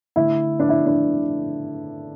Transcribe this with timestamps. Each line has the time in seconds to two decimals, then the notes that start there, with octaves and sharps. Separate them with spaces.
0.16 D3 A3 E4
0.60 D4
0.69 E4
0.86 D4